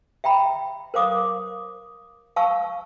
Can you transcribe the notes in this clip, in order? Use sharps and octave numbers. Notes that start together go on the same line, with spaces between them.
E5 G5 A#5 B5
A#4 C5 F5 D6 D#6
F5 A5 C#6 E6